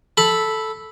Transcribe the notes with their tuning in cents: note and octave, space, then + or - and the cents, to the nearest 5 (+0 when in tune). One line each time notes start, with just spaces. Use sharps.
A4 -5 B5 +0